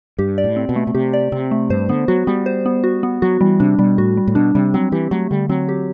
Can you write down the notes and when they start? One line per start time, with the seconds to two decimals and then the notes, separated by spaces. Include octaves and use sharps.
0.18 G2 G4
0.38 D5
0.44 A2
0.56 C4
0.69 B2
0.76 A3
0.87 B2
0.95 C3 G4
1.13 D5
1.32 C3 C4
1.51 A3
1.70 G2 C5
1.89 D3 B3
2.08 F#3 F#4
2.27 G3 B3
2.46 C5
2.66 B3
2.84 F#4
3.03 B3
3.22 F#3 F#4
3.41 E3 G3
3.60 C3 D4
3.79 B2 G3
3.98 A2 F#4
4.17 G3
4.27 A2
4.35 B2 D4
4.55 C3 G3
4.74 F#3 C4
4.92 E3 G4
5.11 F#3 A3
5.31 D3 G3
5.49 F#3 C4
5.69 G4